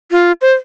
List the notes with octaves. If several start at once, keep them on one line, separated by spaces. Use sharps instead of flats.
F4
C5